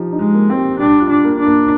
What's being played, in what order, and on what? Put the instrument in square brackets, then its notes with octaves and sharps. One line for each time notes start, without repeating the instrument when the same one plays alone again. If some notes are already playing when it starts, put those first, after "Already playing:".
Already playing: [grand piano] F3 D#4 G4
D#4
[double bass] G#3
[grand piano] A#3
[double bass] C4
[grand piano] G4
[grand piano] G3 [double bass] D4
[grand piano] F4
[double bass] D4
[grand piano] A#3
[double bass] D4
[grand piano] A#3